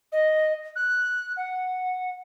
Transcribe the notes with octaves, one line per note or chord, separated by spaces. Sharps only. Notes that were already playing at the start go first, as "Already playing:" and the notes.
D#5
F#6
F#5